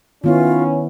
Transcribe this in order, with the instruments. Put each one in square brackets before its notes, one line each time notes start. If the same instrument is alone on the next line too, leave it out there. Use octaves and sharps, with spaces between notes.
[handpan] D#3 B3 E4 [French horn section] C#4 [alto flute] F4